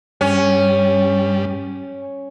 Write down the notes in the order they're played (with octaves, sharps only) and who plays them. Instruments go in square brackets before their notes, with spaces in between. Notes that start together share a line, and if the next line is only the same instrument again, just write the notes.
[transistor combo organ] G2 G3 [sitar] C#4